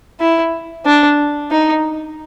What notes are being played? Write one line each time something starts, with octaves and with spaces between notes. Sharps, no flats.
E4
D4
D#4